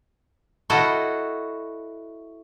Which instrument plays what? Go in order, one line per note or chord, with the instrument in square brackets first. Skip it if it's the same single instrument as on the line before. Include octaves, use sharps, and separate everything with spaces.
[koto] E4 F#4 A4 D#5 F5 F#5